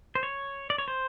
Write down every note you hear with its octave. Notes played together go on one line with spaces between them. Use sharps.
C5
C#5
D5
C#5
C5